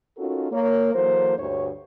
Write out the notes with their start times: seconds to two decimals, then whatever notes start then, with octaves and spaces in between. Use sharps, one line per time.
0.18 C#4 D#4 F4 F#4 A4 A#4
0.52 A#3 C#5
0.94 E3 F#3 A#3 A4 C5
1.37 D2 G2 C#5